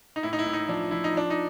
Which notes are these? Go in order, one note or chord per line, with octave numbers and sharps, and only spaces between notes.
D#4
A2 E4
D#4
E4
A2
D#4
F3 D4
F3 E4
D#4
F3 D4
D#4